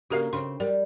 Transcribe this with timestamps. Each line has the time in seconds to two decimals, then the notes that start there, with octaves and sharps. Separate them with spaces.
0.10 C#3 A#3 F#4 G4 A#4 F5
0.33 C#3 C4 C6
0.60 G3 A#4